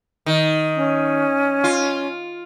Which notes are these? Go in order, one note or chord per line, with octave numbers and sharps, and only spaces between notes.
D#3
C#4
F4